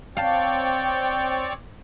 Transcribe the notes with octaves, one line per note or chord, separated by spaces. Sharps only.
C4 C#5 D5 F5 G5 A5